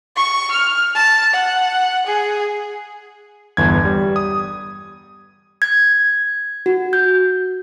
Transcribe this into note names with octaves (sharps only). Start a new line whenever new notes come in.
C#6
F6
A5
F#5
G#4
G1 E2 G#6
G3
D#6
G#6
F#4
G6